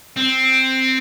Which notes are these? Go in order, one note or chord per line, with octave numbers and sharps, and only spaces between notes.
C4